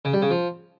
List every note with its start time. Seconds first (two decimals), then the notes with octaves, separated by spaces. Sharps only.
0.05 C#3
0.13 G3
0.22 C#3
0.30 F3